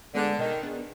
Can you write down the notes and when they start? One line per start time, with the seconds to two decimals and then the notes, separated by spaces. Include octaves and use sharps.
0.15 D3 G#3 B3 D4 G#4
0.38 B2 D#3
0.62 B3 D4 G#4